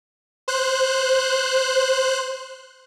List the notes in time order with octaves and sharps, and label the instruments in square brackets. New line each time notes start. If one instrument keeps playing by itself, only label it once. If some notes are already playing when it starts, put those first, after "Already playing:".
[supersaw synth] C5 F#6